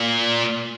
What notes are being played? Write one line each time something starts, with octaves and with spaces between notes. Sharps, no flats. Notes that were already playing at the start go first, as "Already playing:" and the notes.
Already playing: A#2